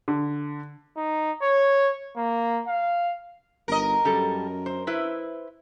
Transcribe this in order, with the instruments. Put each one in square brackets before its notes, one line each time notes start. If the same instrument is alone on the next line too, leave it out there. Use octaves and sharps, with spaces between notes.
[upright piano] D3
[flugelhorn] D#4
C#5
A#3
F5
[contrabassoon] G1 [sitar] A#4 D#5
[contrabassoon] F#2 [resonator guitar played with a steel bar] G3 A4
[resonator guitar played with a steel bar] C5
E4 B4 C5